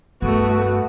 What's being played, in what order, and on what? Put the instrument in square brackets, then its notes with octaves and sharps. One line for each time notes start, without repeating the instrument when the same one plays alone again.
[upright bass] G2 [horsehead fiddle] A3 F#4 [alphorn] B3